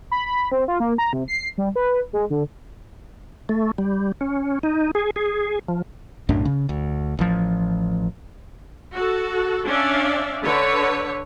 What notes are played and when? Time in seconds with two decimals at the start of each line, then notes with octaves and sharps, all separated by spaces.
0.11 B5
0.26 B5
0.51 C4
0.68 F4
0.80 A#3
0.98 A#5
1.13 C3
1.28 C7
1.58 G3
1.76 B4
2.13 G#3
2.30 D3
3.49 A3
3.78 G3
4.21 C#4
4.63 D#4
4.95 G#4
5.16 G#4
5.68 F3
6.29 B1 F#2 A2 D4
6.45 C#3
6.69 D2
7.19 A1 F3
8.93 F#4 A4
9.66 C#4 D4 D5 E5 F5
10.43 D3 B4 C#5